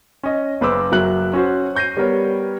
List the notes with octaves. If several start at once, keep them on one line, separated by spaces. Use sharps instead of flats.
C#4 D#5
F#1 B4 C5 D6 E6
F#1 F#3 A#4 E5 F#6 F#7
C#4 F#4 C5
C#6 G6 A#6 C7 D#7
G3 B3 G4 A#4 C#5